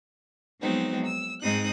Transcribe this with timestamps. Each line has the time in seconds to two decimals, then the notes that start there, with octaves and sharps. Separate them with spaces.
0.61 F3 F#3 G#3 B3 C4 D#4
1.06 E6
1.42 G#2 G#3 C4 D#4 D#6 F#6